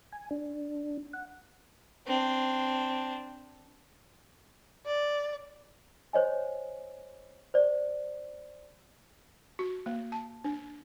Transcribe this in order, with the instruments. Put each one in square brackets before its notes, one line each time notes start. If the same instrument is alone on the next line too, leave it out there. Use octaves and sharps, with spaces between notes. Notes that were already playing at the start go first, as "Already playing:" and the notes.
[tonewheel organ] G#5
D4
F#5
[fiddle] C4 D4
[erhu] D5
[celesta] C5 C#5 D#5 G#5
C5 D5
[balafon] F#4
A#3
A5
D4